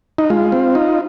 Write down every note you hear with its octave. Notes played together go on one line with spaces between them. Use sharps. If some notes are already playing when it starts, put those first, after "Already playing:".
D#4
G#3 F4
C4
D#4